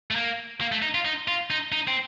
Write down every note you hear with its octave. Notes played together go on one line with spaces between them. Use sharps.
A3
A#3
A#3
A3
D#4
F4
D#4
F4
D#4
D#4
C4